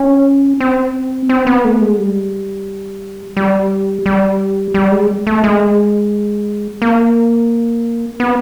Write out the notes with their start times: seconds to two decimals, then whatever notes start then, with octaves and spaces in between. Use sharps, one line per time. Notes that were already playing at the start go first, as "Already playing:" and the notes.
Already playing: C#4
0.60 C4
1.29 C4
1.47 B3
1.64 A3
1.81 G#3
1.98 G3
3.37 G3
4.06 G3
4.74 G3
4.92 G#3
5.27 A3
5.44 G#3
6.82 A#3
8.20 B3